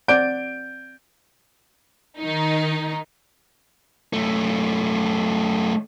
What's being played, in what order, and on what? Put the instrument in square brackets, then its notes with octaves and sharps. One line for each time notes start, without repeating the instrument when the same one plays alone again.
[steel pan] C4 D5 F#5 [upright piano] G6 D7
[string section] D#3 D#4
[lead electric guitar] F#2 A3